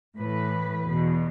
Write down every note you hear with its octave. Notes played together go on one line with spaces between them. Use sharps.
A2 E3 B4
E2 B2